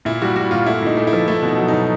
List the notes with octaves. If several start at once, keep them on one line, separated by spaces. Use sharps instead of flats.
A#2 E4
G3 F#4
G3 F#4
A#2 F4
A3 E4
A#2 D#4
A3
E4
F3
A3 E4
B2
D#4
F#3
B2 D#4